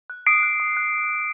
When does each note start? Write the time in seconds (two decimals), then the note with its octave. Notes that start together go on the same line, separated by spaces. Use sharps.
0.10 F#6
0.26 D#6 C7 D7
0.43 F#6
0.60 D#6
0.77 F#6